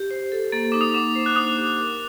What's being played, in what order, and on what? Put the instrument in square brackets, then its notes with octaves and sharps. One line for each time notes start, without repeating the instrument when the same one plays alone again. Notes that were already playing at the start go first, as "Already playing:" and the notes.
Already playing: [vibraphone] G4
C5
A4
[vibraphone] A#3 [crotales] A6
[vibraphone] D#4 [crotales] D6
[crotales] D#6
[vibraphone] F#5 [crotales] D6
[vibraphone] C5
[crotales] F#6
[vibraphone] D4 [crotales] D#6
[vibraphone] G4
A#4